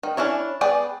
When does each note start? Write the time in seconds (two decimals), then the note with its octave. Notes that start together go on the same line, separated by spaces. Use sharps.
0.03 D#3
0.17 C#4 D4 E4 C#5
0.61 B3 G#4 D5 G5